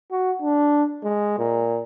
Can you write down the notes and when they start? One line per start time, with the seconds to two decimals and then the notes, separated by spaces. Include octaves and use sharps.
0.11 F#4
0.42 D4
1.04 G#3
1.38 A#2